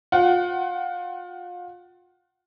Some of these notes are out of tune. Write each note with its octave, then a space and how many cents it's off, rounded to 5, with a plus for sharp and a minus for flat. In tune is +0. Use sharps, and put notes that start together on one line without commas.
F4 +30 F#5 +20